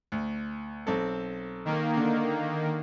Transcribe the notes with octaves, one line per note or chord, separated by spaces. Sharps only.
D2
B1 C4 A4
D#3 A#3
D3